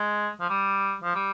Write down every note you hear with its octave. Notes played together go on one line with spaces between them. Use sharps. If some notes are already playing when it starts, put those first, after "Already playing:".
Already playing: G#3
F3
G3
F3
G3